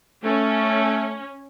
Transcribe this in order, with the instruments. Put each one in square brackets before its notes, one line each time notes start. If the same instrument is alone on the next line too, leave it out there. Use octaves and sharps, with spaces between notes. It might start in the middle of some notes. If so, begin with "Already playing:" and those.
[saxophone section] A3 [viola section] C#4